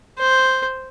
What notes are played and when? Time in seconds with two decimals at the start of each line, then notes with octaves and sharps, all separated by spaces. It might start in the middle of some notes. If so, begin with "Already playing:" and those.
0.18 C5